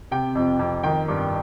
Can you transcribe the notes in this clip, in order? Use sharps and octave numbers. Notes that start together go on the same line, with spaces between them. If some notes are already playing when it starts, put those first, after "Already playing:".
C3 G5
F2
F2
D#3 G5
G2